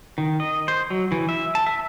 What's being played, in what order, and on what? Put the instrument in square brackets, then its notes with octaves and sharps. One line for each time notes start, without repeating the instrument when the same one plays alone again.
[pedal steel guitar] D#3
D#5
C5
F#3
E3
E5
A5
E5